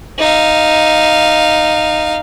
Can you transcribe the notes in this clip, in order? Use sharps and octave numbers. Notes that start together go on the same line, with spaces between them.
D#4 F5